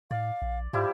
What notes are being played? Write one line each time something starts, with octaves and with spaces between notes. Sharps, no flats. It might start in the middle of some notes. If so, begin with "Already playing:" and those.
A2 D5 F5
A#1
G#2 F3 G3 E4 G4